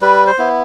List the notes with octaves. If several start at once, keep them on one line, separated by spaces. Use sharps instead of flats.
G3 B4
C5
B3 E4